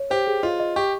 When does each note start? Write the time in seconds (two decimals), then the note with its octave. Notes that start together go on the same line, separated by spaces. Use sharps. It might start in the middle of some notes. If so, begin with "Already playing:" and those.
Already playing: C#5
0.10 G4 C5
0.27 G#4
0.43 F4 D#5
0.60 D#5
0.76 G4 C#6